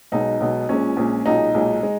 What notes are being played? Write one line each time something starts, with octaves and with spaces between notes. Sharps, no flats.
B1 B2 G#3 D#4
B1 B2 G#3
A#1 A#2 G#3 C#4
A#1 A#2 G#3
B1 A#2 G#3 D#4
B1 A#2 G#3
G#3